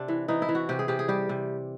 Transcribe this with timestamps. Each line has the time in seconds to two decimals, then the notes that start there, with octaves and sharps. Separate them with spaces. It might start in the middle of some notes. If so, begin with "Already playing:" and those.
Already playing: C3 D4
0.08 E3
0.28 E3 D#4
0.42 E4
0.49 E3
0.55 F#4
0.69 C3 G4
0.79 G#4
0.88 C3 G4
0.99 G#4
1.08 G3 G4
1.29 C3